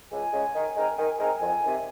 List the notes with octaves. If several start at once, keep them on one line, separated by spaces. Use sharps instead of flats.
C#2 G#5
C#3 G#3 C#4
D#3
G#3 C4 D#4 A#4
D#3 G#5
G#3 C4 D#4 A#4 G#5
F2 G#5
C3 D#3